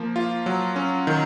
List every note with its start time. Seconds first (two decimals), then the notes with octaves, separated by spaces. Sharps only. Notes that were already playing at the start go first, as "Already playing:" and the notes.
Already playing: F3 A#3
0.16 F4
0.46 F#3
0.76 C#4
1.07 D#3